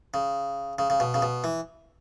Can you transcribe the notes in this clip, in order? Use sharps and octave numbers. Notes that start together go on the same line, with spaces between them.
C#3
C#3
C#3
B2
C#3
B2
E3